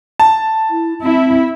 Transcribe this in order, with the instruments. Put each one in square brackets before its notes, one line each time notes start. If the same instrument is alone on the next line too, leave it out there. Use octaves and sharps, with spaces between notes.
[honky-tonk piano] A5
[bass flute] E4
[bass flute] C4 [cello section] E4